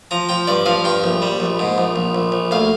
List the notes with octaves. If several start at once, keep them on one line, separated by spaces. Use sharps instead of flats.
F3 A#5
F3 G5
G2 D5
F3 F5
G2 G5
A#1
G3
A#1
G#2
A#1
A#1
A#1
A#1
D2 F5